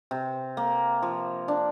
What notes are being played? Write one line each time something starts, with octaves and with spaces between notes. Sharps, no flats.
C3
A#3
F3
D4